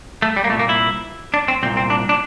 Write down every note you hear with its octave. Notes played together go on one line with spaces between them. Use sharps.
A3
G3
A#3
C2 A#2 A3
A#3
E4
D4
C4
C2 A#2 C4
C4
D4
D4